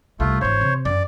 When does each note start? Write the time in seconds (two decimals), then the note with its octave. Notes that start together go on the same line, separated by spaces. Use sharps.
0.20 C2 A3 F4
0.41 G#1 E3 C5 C#5
0.61 C3
0.85 F#2 D5